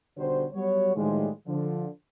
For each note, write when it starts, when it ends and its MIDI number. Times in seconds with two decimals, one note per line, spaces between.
0.17 0.45 35
0.17 0.45 50
0.17 0.45 54
0.17 0.45 55
0.17 0.45 72
0.53 0.93 54
0.53 0.93 55
0.53 0.93 59
0.53 0.93 66
0.53 0.93 73
0.95 1.29 45
0.95 1.29 51
0.95 1.29 53
0.95 1.29 55
0.95 1.29 56
1.47 1.86 50
1.47 1.86 53